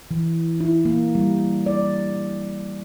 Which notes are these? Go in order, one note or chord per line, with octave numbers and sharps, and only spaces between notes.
E3
E4
A#3
G3
D5